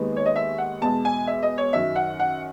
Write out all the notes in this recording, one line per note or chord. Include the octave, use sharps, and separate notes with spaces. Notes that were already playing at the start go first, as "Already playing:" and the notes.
Already playing: D#2 D#3 G#3 B3
C#5
D#5
E5
F#5
E2 B2 G#3 A5
G#5
E5
D#5
C#5
F#2 D#3 F#3 E5
F#5
F#5